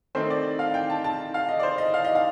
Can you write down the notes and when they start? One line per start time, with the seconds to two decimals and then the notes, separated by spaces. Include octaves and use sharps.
0.15 D#3 A3 C4 D#4 C5
0.30 D5
0.59 F5
0.74 G5
0.90 A5
1.04 A5
1.34 F5
1.49 D#5
1.59 D5
1.63 C5
1.78 D#5
1.94 F5
2.05 D#5
2.15 F5